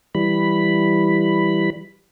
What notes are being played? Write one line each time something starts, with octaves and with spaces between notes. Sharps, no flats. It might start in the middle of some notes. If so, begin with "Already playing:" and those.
E3 G3 B5